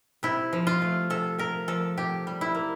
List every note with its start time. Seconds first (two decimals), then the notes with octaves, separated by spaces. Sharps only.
0.23 C3 E4
0.53 F3
0.67 F4
0.82 A3
1.10 C3 A4
1.39 C3 A#4
1.68 F3 A4
1.97 C3 G4
2.27 G3
2.41 E4
2.55 A#3